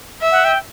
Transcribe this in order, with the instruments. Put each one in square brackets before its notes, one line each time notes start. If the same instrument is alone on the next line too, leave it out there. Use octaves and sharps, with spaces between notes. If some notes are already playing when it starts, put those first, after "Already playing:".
[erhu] E5
[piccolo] F#5
G5